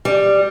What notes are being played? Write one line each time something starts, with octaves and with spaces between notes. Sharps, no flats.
G3